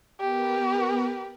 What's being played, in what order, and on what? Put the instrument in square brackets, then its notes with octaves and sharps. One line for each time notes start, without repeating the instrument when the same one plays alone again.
[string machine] B3 A#4 B4 [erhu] G4